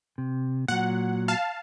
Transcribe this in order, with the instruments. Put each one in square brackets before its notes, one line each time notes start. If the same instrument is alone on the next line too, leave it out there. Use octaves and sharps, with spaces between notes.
[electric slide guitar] C3
[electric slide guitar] A#2 F#3 [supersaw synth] F#5
[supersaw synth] F5 A5